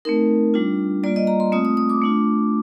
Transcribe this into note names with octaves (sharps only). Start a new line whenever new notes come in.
A3 C4 D#4 A#4
G3 D4 F4
G3 A#3 F4 D5
D#5
A#5
C6
A3 C4 F4 D#6
D#6
D#6
D6
A3 D4 F4